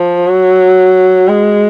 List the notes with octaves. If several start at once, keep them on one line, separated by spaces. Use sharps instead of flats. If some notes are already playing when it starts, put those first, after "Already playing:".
Already playing: F3
F#3
G#3